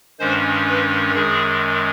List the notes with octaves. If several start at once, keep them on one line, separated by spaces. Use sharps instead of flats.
G2 D#3 G#3 C#4 C5
B4
F#2 D#3 G#3 G#4